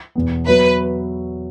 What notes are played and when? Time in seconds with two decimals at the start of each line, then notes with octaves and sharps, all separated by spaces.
0.15 E2 B2 B3
0.46 F#3 B3 F#4 B4 C#5 E5